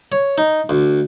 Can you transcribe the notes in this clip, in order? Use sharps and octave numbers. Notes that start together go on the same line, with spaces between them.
C#5
D#4
D2